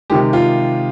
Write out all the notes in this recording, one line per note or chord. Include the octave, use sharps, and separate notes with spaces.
C3 D#3 G#3 G4
F4